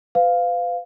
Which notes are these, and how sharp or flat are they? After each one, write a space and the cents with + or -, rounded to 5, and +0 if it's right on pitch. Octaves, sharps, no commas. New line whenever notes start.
B4 +40 F5 +0